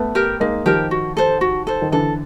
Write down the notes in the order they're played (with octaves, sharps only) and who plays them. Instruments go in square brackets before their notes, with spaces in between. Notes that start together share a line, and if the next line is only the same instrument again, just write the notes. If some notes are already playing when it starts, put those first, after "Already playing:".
Already playing: [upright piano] A3 B3
[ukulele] G4 A#4
[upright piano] G#3 A#3 [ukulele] D#4
[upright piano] D#3 F3 [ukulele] G4 A#4
[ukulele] F#4
A4 C5
F#4
A4 C5
[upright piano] D#3
[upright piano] D3 E3 [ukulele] A4